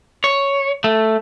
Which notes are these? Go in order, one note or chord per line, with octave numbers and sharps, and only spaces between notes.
C#5
A3